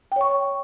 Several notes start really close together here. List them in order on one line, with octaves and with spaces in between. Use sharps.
G5 C#5 C#6